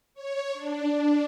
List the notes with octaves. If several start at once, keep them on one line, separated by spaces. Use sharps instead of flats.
C#5
D4
D4